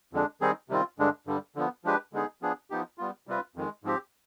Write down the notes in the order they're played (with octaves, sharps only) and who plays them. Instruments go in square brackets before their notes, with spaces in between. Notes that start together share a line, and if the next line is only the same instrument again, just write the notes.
[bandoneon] F2 D3 G#3 D4
D#3 G3 C4 D#4 G#4
C3 D#3 G3 C4 F4
G2 D3 G#3 D4
G2 D3 G3
D3 F3 B3
F3 G#3 D4 G4 B4
D3 G#3 B3 D#4 G#4
F3 B3 D4 G#4
F3 B3 D#4 G4
G3 B3 F4
C3 G3 C4 F4 B4
F2 D#3 G#3
G#2 F3 C4 G4